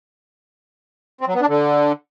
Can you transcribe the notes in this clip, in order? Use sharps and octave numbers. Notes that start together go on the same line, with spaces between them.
C4
F#3
B3
D4
D3